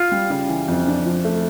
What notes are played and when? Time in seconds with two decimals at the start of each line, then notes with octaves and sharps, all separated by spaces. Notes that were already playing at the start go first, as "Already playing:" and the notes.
Already playing: F4
0.12 G3
0.30 C#3
0.48 E3
0.68 F2
0.87 D4
1.06 F3
1.25 A3